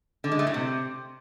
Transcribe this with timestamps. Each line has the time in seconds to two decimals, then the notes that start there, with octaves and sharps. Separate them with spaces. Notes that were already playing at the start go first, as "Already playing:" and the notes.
0.24 D3
0.32 G#3
0.39 A3
0.47 A2
0.54 C3